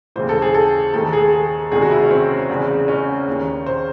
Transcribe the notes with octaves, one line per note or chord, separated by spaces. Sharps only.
D#2 C#3 E3 C5
A4
G#4
A4
D#2 D#3 A4
G#4
G#4
E2 C3 D#3 G#4
F#4
E4
C#4
C4
E2 C#3 E3
C#4
D#2 D#3
C5